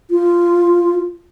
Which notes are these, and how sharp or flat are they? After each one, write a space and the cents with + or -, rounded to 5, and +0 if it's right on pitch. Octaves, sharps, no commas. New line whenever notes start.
F4 -10